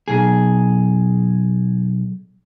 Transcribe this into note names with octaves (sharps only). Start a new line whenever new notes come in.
B1 G#4